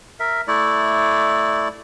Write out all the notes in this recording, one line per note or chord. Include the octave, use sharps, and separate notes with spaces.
A#4 E5
A3 E4 D5